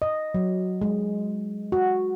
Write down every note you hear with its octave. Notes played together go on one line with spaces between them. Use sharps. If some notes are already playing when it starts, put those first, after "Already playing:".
D#5
F#3
G#3
F#4